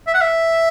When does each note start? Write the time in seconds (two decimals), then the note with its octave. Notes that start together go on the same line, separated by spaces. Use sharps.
0.07 E5
0.14 F#5
0.21 E5